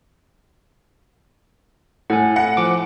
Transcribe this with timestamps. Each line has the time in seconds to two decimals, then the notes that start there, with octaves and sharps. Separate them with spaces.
2.10 A2 F#5 G#5
2.36 E4 F#5
2.57 F3 D6